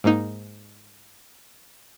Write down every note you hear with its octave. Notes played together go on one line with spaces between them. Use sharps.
G#2 A#3 D#4